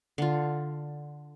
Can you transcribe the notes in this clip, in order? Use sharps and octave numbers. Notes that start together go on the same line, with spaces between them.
D3 F4